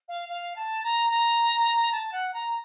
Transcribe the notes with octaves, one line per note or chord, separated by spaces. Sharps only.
F5
F5
A5
A#5
A#5
A5
F#5
A#5